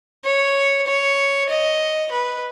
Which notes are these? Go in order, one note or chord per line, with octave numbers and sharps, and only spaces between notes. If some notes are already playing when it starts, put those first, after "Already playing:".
C#5
C#5
D#5
B4